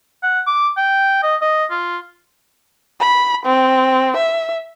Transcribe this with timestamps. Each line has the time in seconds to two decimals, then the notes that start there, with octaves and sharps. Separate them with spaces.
0.23 F#5
0.47 D6
0.77 G5
1.23 D#5
1.42 D#5
1.71 F4
3.00 B5
3.46 C4
4.17 E5